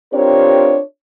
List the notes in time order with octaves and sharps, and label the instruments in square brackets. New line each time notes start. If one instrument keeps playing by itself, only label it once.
[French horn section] C4 D4 F4 G4 A#4 C#5